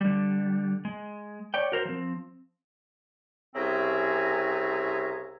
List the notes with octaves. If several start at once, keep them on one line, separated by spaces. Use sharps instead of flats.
D3 G3
G#3
C#5 D5 G5
F#4 A#4 C5
F3 C4
C2 C#3 C4 E5 G#5 A#5